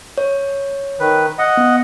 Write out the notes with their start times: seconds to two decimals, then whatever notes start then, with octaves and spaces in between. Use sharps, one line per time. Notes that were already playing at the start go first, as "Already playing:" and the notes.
0.18 C#5
1.00 D#3 B4
1.38 D#5 F#5
1.57 B3